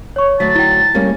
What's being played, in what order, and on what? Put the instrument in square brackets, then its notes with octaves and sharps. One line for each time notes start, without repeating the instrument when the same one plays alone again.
[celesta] C#5 C#6
[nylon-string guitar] D2 F#3 [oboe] A5 [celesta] B6
[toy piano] E4 G5
[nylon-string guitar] G3 A#3 C#4